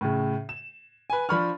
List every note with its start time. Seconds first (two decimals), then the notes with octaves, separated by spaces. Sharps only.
0.01 A2 C#3
0.49 E7
1.10 B4 G#5
1.29 F3 D4 B5 C#6 F6